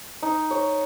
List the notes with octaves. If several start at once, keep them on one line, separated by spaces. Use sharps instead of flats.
D#4
C#5